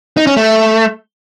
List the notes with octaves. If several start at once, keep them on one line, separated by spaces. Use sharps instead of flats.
D#4
C#4
A3